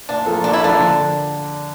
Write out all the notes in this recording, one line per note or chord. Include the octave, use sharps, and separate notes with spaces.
A#2 D4
F3 A#3 F4 A4
A#2 D4
E4
F3 A#3 D4 F4 A4
D3